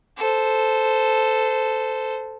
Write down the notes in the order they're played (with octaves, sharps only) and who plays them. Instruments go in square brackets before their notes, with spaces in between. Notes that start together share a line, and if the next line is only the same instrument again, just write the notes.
[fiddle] A4 C5